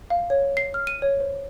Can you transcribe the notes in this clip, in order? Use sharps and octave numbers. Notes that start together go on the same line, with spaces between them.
F5
C#5
C7
F6
D#7
C#5
C5